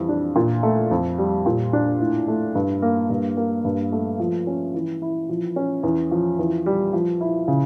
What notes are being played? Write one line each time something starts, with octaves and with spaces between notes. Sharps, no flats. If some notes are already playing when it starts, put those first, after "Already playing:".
Already playing: F2 E3 G3
D4
A#2
A3
F2
G3
A#2
D4
A2
A3
G2
A#3
G2
A#3
G2
A3
F3
C#4
E3
E4
F3
C#4
E2
F3
E2
G3
F3
E4
C#3